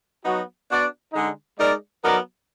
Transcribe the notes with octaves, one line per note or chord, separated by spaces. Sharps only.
F#3 B3 D#4 F#4
B3 D4 F#4 D5
D3 G#3 D#4
G#3 D#4 A#4 D5
F#3 B3 D#4 A#4 D5